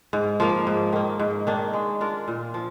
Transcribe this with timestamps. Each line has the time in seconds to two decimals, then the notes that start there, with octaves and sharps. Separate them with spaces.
0.13 G#2
0.40 F3 A#3
0.67 G#2
0.93 D#3 A#3
1.20 G#2
1.47 D#3 A#3 D4
1.73 G#3
2.01 D4 F4 A#4
2.28 A#2
2.54 F3